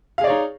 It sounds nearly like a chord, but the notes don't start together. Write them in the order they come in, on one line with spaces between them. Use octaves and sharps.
F5 G#4 D5 C#5 D#4